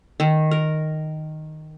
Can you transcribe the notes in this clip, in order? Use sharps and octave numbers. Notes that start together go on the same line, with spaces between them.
D#3
A#4